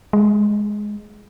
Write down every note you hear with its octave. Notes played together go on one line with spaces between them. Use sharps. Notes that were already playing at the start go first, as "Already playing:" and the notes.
G#3